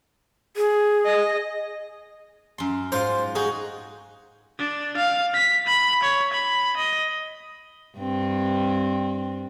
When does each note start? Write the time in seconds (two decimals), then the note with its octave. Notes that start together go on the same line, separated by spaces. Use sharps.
0.57 G#4
1.05 D#5
2.58 F#2 C6
2.92 G#2 F4 C5 C6
3.35 D#4 F#4 G#4
4.59 D4
4.97 F5
5.34 B6
5.67 B5
6.03 C#5
6.33 B5
6.77 D#5
7.98 G2 C4